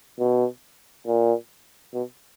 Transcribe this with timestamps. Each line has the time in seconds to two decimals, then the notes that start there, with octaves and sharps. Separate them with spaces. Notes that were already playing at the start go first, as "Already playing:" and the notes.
0.19 B2
1.07 A#2
1.94 B2